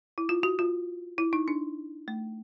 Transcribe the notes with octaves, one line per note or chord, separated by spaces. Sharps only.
E4
F4
F#4
F4
E4
D#4
D4
A3